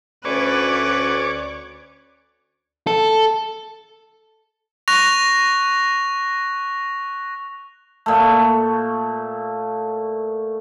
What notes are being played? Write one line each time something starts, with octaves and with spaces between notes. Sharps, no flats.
D2 C#4 B4 C#5 D5 D6
A4
C#6 F#6 A#6 F7
A#2 A3